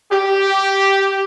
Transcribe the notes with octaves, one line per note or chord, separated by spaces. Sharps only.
G4